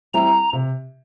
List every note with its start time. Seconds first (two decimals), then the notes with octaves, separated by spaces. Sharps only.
0.13 G3 C4 E4 G4 A#5
0.53 C3